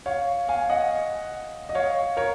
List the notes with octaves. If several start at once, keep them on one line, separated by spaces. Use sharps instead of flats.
C#5 F5
F5 G#5
D#5 F#5
D#5
C#5 F5
A#4 C#5